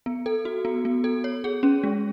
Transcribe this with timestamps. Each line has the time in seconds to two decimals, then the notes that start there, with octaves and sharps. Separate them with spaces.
0.06 B3
0.26 A4
0.45 F#4
0.65 B3
0.85 B3
1.04 A4
1.24 C#5
1.44 G#4
1.63 C#4
1.84 G#3